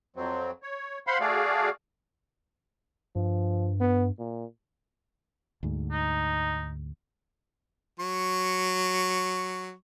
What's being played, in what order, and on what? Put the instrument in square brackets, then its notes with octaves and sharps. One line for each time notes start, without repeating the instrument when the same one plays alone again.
[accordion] F2 F#3 C4
C#5
C5 F5 F#5 B5 C6
A3 F#4 G#4 D5 F5
[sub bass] G2 [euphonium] F3
[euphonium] B3
A#2
[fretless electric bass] D2 G#2
[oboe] D#4
[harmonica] F#3 C#6